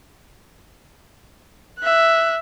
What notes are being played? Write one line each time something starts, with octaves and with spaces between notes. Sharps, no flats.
E5 F#6